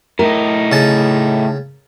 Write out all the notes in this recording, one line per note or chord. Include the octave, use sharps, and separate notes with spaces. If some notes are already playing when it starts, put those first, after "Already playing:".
A2 D#4 A#4
C#3 A5